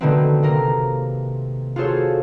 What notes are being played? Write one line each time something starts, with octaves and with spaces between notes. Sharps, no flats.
B2 D3 D#3 A3 B3 C4
C3 A#3 A#4
F4 F#4 G#4 A4 C5 C#5